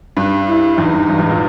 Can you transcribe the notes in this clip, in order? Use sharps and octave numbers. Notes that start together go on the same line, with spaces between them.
G2
E4
E2 D#4
G2
G2
E2 G#2
A#2